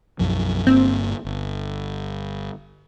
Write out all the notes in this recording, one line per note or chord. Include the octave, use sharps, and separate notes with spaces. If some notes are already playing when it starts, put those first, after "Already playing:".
B1 F#2 F3
G1 G2 A#3 C4
G1